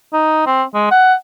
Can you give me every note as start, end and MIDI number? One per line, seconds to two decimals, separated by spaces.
0.13 0.43 63
0.46 0.63 60
0.74 0.89 56
0.91 1.14 78